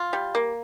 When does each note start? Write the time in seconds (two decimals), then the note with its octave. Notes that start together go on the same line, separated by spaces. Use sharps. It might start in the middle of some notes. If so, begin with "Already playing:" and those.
Already playing: F4
0.13 G3
0.35 A#3